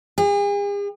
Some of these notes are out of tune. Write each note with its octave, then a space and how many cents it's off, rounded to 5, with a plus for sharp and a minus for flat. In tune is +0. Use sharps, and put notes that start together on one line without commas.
G#4 -45